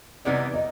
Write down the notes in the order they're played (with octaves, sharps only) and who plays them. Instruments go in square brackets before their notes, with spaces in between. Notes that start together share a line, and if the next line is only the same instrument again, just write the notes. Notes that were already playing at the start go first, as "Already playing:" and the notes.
[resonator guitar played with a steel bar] C3 E3 G3 B3 D#4 [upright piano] D5
[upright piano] D#5